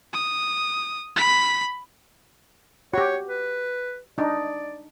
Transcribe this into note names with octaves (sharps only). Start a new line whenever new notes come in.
D#6
B5 B6
F#4 G4 C#5
B4
D4 D#4 D5